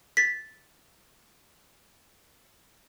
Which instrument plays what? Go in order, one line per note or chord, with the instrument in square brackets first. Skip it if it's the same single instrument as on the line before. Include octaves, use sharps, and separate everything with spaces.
[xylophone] A6 B6